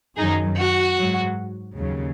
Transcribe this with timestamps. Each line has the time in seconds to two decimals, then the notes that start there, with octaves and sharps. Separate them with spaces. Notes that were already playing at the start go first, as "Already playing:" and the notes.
0.17 F#2 D#3 F#3 D#4 G#4
0.57 F#4
0.96 G#2 F#3
1.76 D#2 C#3 F#3